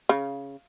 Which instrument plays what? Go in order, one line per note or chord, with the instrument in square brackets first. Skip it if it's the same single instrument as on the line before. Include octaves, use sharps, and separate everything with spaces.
[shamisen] C#3